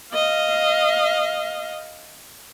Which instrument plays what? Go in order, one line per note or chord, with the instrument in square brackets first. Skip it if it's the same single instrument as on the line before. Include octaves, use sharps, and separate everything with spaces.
[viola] D#5 F5